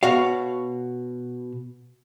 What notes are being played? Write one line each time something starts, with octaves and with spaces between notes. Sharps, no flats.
B2 F#4 C#5 F5